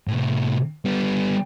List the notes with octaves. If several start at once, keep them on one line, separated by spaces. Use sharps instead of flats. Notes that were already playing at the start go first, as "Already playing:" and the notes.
A2 C3
G3 B3